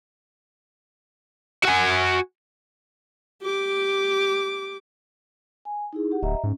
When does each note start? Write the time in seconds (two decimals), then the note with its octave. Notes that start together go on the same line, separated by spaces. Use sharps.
1.64 F#4 G#5
3.42 G4 D6
5.65 G#5
5.93 D#4 E4 G#4
6.11 G4 F#5
6.22 D1 D#5 E5 A#5
6.44 G#2 C#4